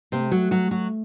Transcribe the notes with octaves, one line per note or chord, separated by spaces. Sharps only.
C3 A#3 C4
A3
G#3
F#3 A3 F#4
F#3 F#4
F#3 F#4